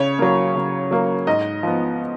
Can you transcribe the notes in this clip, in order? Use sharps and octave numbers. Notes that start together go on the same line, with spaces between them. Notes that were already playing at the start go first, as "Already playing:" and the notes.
Already playing: C#3 C#5
F#3 A#3
C#3
F#3 A#3
G#2 D#5
F3 B3